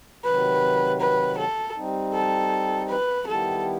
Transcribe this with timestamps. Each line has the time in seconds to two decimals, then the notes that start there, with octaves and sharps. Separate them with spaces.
0.24 C3 D#3 F#3 B4
1.01 B4
1.38 A4
1.75 G3 C4 D#4
2.14 A4
2.89 B4
3.27 D#3 G3 B3 E4 G4 A4